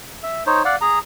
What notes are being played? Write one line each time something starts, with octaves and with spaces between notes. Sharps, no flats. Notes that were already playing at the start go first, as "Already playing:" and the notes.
E5
D#4 C5 C#5
D5 F5 F#5
G#4 A#5